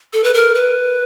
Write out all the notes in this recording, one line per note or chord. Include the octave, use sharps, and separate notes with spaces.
A4
B4
A#4
B4